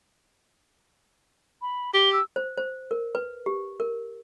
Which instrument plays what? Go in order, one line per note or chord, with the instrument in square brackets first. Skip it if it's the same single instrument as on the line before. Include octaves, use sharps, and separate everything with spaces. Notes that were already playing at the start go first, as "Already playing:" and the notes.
[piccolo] B5
[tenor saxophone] G4 [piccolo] G7
[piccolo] E6
[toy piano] C5
C5
A#4
B4
G4
A#4